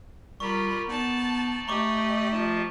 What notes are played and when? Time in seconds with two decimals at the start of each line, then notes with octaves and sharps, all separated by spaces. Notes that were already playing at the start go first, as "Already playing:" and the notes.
0.40 G3 F4 G4 A#4 B5 C#6
0.88 B3 D#4 D5 A5
1.68 A3 G4 D#5 A#5 C#6 D6
2.32 F3 F4 A5